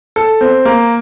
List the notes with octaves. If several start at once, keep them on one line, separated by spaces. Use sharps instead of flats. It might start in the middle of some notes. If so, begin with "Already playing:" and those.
A4
C4
A#3